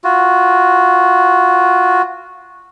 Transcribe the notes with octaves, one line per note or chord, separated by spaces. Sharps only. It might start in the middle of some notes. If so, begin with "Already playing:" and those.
F4 F#4